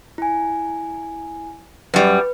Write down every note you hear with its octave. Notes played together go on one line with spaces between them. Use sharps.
E4 G#5
F#2 G3 B4